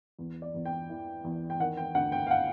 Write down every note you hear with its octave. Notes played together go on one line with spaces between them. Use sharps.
E2
D5
E2
G5
E3
E2
G5
D#3 F#5
G5
D2 F#5
G5
F5
F#5